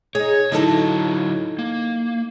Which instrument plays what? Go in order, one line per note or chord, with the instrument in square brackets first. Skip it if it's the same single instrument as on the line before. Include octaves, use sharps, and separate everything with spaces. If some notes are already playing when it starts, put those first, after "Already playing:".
[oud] D#4 G#4 [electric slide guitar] C#5
[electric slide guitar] D3 F#3 [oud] D#4 E4 A4
[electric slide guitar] A#3